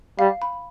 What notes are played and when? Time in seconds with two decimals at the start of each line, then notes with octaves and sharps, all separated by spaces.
0.19 G3 F5
0.42 B5